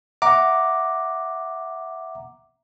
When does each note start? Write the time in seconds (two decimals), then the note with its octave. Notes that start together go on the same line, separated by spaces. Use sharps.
0.22 E5 F#5 A#5 D6